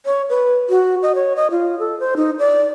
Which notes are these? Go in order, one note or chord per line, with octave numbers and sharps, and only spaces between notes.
C#5
B4
F#4
D#5
C#5
D#5
F4
A4
C5
D#4
D5